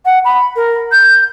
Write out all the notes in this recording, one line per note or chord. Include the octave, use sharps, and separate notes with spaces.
F#5
B5
A#4
G6